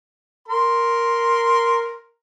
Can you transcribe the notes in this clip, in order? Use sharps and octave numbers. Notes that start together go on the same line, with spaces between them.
A#4 C6